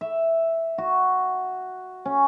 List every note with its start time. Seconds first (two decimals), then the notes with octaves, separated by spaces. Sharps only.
0.01 E5
0.78 F#4
2.05 C#4